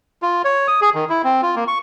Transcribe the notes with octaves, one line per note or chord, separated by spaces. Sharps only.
F4
C#5
D#6
G#4
D#3
E4
C4
F4
A#3
C#6